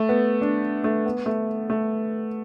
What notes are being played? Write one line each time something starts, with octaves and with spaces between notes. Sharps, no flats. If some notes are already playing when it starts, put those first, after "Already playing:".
Already playing: A3
B3
D4
A3
B3
A3
A3